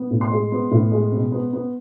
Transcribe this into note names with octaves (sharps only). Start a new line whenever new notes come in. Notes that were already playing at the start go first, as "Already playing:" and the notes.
Already playing: B3
A2
C6
G#3
B3
A2
G#3
B2
B3
B3